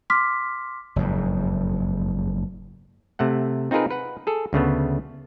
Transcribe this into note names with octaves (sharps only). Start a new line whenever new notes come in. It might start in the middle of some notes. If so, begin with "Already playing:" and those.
C6 D6 F6 B6
F#1 F2 G#2
C3 A3 F#5
C4 D#4 F4 G#4 A#4 B4
B4 F#5
G#4 A4
D2 C#3 A3 B3